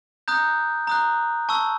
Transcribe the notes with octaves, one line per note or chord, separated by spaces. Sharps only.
A#5 D#6 F#6 G6
A#5 D#6 F#6
A5 C#6 E6